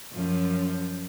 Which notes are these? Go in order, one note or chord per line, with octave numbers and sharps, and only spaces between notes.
F#2 F3